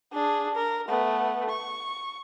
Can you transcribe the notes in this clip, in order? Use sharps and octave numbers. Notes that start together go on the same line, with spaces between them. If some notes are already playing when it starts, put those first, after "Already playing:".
D4 G#4
A#4
A3 B3
C#6